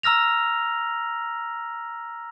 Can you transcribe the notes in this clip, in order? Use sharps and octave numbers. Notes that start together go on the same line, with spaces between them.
A#5 E6 F6 A#6 F7